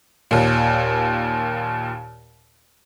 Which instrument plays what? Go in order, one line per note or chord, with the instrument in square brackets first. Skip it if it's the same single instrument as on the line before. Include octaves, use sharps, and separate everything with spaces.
[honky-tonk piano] D#2 A#2